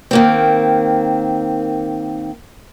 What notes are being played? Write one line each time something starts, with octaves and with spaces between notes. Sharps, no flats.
D#3 A#3 C4